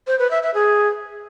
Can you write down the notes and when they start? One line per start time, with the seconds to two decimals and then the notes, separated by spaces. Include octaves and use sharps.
0.07 C5
0.19 B4
0.31 E5
0.43 E5
0.54 G#4